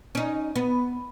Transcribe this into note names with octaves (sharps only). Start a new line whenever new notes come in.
C#4 D#4
B3